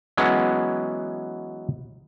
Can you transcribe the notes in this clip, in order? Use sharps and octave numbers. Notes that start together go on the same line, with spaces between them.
E3 F#3 G#3 B3 C#4